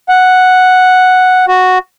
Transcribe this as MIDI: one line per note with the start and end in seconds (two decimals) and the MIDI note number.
0.09 1.45 78
1.48 1.78 66